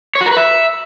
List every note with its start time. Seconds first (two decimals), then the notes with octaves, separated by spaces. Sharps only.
0.15 C#5
0.21 F#4
0.26 A#4
0.31 B4
0.37 E5